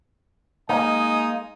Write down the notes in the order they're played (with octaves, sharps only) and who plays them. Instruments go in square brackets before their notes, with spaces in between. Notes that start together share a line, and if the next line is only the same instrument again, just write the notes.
[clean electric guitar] G#3 A#3 [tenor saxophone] D#4 [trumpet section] D#5 G#5